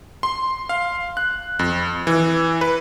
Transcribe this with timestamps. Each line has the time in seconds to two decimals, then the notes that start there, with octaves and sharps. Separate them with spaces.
0.23 C6
0.69 F5
1.17 F#6
1.59 F2
2.07 E3
2.61 B4